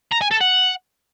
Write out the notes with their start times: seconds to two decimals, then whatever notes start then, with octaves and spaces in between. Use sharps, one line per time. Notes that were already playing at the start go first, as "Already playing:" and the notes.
0.12 A#5
0.22 G#5
0.31 A4
0.41 F#5